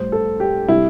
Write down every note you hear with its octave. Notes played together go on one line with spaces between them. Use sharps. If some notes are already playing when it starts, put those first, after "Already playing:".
Already playing: A2 G3 C5
A4
G4
C3 G3 E4